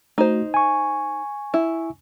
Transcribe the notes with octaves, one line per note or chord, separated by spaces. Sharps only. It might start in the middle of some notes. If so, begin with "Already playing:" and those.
A3 D#4 F#4 C5
G#5 C#6
E4